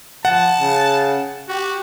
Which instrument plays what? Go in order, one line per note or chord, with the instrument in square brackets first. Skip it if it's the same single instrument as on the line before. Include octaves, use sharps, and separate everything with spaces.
[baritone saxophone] F3 [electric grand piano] F#5 [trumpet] A5
[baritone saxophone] C#3
[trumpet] F#4 [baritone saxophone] G4